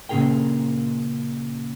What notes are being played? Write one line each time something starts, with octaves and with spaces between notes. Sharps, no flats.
A#2 C#3 G#4 A#4 G5